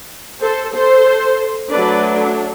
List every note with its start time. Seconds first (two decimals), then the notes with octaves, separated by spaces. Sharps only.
0.42 A4 C5
0.73 A4 C5
1.70 F#3 A3 D4 B4 D5